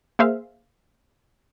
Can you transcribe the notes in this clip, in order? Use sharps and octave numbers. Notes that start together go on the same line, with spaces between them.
A#3 G#4 C5 E5 F5